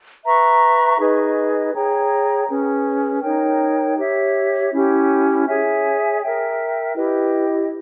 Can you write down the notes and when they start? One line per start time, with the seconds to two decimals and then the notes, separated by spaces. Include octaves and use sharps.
0.24 B4 E5 A#5 C#6
0.99 D#4 G#4 B4 D#5
1.74 G#4 C#5 G5 A#5
2.48 C#4 G#4 B4
3.22 D#4 A#4 C#5 G5
3.98 G4 C#5 E5
4.72 C#4 E4 G4
5.47 G#4 C#5 E5 G#5
6.21 A#4 E5 G5
6.95 E4 G4 B4 D#5